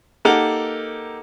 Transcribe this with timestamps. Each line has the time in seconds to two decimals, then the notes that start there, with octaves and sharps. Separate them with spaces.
0.25 A#3 D#4 G4 A4 A#4 F#5